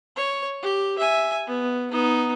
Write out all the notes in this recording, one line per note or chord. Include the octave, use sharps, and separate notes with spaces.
C#5
G4
E5 G#5
B3
B3 D#4